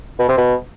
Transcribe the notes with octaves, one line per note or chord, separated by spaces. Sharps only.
B2
C3
B2